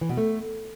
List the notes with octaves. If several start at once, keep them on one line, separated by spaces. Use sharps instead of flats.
E3
B2
A3